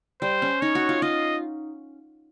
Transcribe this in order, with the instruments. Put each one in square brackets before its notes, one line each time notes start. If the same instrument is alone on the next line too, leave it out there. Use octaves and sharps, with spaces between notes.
[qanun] G3 [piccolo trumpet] C5
[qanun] C#4
[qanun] D#4 [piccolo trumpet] C#5
[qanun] F#4
F4
[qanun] F4 [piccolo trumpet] D#5